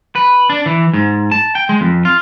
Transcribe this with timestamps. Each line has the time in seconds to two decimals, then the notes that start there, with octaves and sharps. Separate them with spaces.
0.15 B4
0.50 D4
0.66 E3
0.94 G#2
1.31 A5
1.55 G5
1.69 G#3
1.81 F2
2.05 F4